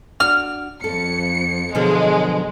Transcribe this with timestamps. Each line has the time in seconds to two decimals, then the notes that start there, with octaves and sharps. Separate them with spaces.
0.20 D4 F#4 F6
0.84 F2 A4 C#7
1.75 B2 D3 F3 F#3 G#3